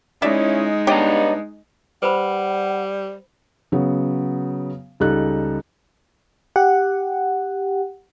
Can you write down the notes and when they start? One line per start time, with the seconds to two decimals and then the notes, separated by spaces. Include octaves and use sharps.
0.22 G#3 C#4 D#4 E4 D5 E5
0.87 G2 B3 D4 G4 C#5 D#5 A#5
2.03 G3 B4 C5 F#5 B5
3.72 C#3 F#3 B3
5.00 C#2 G3 D#4 A4 F#6
6.56 G4 F#5